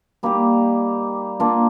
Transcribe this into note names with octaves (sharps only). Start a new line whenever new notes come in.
G3 A#3 D#4 G4
A#3 D4 F4